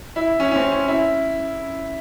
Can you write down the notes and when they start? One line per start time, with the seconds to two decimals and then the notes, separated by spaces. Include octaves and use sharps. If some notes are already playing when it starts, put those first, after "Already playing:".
0.16 E4
0.40 C#4
0.52 C#4
0.56 C4
0.72 C#4
0.88 E4